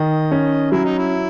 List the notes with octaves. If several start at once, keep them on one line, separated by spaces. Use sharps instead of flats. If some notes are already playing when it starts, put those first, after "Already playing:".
Already playing: D#3 D#5
C#4
F#3 E4
D#4
E4